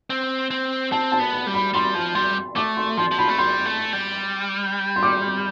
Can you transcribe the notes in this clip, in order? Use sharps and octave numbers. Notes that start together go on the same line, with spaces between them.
C4
C4
C4 A5
A5
B3
B5
G3
B5
G3 C6
F3
G3 C6
A3 D6
C6
F3 C6
F3
B5
A3
G3 C6
A3
G3
C6
D6